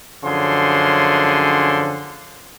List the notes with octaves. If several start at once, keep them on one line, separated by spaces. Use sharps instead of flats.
F#2 D3 F3 C#4 G#4 C6